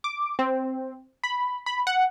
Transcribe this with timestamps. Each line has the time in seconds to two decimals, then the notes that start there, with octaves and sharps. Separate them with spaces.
0.04 D6
0.39 C4
1.24 B5
1.66 B5
1.87 F#5